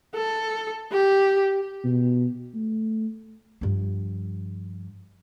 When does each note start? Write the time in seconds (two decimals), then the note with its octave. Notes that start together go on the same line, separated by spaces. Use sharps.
0.15 A4
0.92 G4
1.84 B2
2.54 A3
3.61 G2 F3